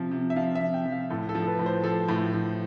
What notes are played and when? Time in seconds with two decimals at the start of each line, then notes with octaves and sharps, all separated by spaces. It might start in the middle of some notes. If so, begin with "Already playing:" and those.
Already playing: C3 F3
0.11 C3
0.30 E5
0.36 F3 F5
0.55 E5
0.61 C3
0.74 G5
0.86 F3
0.92 F5
1.10 A2 A4
1.29 A4
1.35 F3
1.43 A4
1.47 B4
1.59 A2
1.66 C5
1.84 F3 A4
2.09 A2
2.33 F3